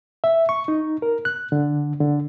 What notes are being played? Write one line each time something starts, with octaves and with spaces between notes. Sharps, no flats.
E5
C#6
D#4
A#4
F#6
D3
D3